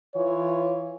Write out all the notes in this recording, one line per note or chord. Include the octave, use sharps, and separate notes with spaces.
E3 F4 C#5